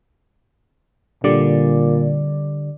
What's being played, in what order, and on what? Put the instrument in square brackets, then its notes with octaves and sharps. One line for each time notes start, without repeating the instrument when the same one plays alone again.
[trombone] A#2 [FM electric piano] D3 G3 D5